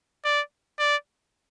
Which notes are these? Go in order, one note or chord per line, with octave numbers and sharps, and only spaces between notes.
D5
D5